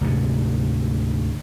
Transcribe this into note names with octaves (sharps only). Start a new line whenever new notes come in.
D2 G#2 C3